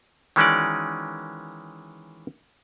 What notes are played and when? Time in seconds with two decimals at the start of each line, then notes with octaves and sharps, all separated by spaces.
0.36 D#3 E3 G#3 C#4 F#4 D5